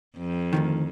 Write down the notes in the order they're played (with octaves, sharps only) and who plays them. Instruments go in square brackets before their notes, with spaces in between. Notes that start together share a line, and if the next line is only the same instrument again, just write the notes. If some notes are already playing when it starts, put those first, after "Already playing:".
[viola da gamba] F2
[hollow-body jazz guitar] D2 G#2 D#3